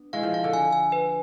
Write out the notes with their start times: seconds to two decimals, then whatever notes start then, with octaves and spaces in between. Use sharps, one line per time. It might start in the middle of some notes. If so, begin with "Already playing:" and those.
Already playing: B3 D4
0.13 E3 G#3 F5
0.23 F3
0.34 F5
0.44 D3
0.53 G#5
0.73 G#5
0.92 B4